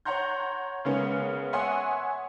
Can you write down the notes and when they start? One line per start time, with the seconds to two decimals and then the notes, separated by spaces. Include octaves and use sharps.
0.05 C#5 F#5 A#5 C6 G6
0.85 C#3 G#3 A#3 B3 C#4
1.53 C#5 E5 F#5 G#5 C6 D#6